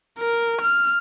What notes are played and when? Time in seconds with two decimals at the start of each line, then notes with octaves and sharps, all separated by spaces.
0.19 A#4
0.61 F6